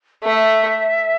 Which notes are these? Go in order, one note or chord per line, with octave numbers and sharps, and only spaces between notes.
A3 E5